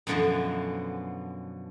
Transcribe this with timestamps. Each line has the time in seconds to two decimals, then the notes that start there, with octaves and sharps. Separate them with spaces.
0.07 F#2 B2 D3 E3 F3